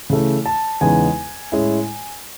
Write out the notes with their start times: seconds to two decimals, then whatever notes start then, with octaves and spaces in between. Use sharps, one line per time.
0.10 C#3 E3 A3
0.46 A5
0.81 E2 C#3 G#3 B3 D#4 G#5
1.52 A2 G#3 C#4 E4